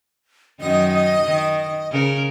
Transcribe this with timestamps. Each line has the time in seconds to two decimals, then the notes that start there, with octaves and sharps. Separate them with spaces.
0.60 F#2 D#3 D#4 D#5
1.25 D#3
1.91 C#3 A#4